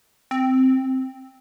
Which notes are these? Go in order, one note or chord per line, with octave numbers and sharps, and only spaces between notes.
C4